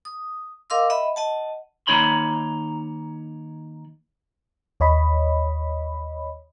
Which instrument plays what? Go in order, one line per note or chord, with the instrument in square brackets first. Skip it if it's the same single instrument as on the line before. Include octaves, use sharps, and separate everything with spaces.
[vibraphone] D#6
A#4 D#5 F5 C6 D6 E6
D#5 E5 F#5 B5
D#5 F#5 A5
[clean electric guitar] D#3 A#3 D#4 C#5 B5 C6
[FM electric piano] D#2 C#5 D#5 B5